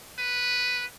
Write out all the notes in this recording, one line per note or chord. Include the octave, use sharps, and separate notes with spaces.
B4